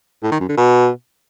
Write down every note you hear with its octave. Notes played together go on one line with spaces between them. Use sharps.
A2
D#3
F#2
D3
B2